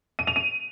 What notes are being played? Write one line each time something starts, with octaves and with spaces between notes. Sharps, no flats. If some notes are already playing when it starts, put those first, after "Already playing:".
D#7
F7
D#7